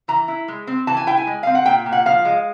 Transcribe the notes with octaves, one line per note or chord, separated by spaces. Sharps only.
E3 A#5
E4
G#3
C4
E3 A5
G#5
E4 G5
G#5
G#3
C4 F5
F#5
A#2 G5
A#2
F#5
F3 F5
G#3